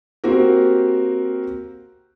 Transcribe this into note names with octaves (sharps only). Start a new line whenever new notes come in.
A#3 C4 F#4 G4 A#4